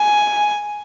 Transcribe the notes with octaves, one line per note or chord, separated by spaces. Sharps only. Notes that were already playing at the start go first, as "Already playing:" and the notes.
Already playing: G#5